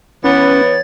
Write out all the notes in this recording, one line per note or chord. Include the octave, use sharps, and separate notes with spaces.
E3 B3 C#4 C#5 A6